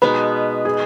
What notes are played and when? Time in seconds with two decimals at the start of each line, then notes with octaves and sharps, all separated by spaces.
0.02 B2 G#3 D#4 B4
0.65 G#4